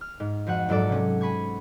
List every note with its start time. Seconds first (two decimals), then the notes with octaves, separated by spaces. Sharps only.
0.01 F6
0.20 G#2
0.46 F2 F3 F#4 F#5
0.69 A#1 G#2 F#3 A4 D5
0.89 C3 C#4
1.21 G#5 B5 C#6 G#6